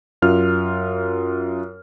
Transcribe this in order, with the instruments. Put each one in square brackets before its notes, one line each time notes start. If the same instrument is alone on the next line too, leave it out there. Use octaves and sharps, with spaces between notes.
[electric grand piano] F#2 F4 F6